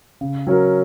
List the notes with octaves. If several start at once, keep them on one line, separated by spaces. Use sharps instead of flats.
C#3
F#3 C#4 F#4 A#4